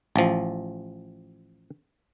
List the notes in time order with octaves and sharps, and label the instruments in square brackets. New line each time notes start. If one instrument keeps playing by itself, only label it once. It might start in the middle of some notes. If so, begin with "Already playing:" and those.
[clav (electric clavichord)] A1 F3